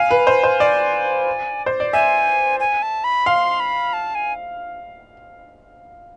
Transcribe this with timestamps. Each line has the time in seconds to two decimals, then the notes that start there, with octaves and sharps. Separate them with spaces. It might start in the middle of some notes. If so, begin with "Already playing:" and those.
Already playing: F5 G#5
0.11 B4
0.27 C5
0.43 C5
0.60 D5
1.66 C5
1.80 D5
1.93 E5 G#5
2.60 G#5
2.82 A5
3.04 B5
3.26 F5 C6
3.60 B5
3.93 A5
4.15 G#5